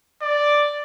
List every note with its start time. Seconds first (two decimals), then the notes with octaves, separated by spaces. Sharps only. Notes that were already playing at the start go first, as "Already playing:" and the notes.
0.22 D5